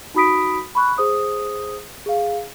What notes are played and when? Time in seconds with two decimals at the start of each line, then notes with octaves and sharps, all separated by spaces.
0.15 D#4 F#4 B5 D#6 B6 D7
0.75 B5 C#6 F#6
0.98 G#4 C5 D#6
2.06 G#4 F5